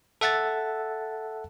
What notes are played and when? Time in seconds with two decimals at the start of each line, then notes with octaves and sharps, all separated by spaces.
0.21 A4 E5 F#5 A5 A6